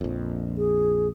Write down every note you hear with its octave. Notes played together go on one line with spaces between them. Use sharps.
A#1 F2
G#4